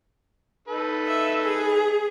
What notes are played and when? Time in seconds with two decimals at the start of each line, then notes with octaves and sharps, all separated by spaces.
0.68 D#4 A4 B4
1.07 E5
1.42 G#4